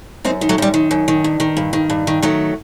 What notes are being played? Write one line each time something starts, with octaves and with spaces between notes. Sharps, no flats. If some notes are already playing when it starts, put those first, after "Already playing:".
F#2 C4 D#4
D#3
F#3 A3
F#2 G3
D#3
F#2
D#3
G2
D#3
G2
D#3
G2
D#3
D#3 F#3 A3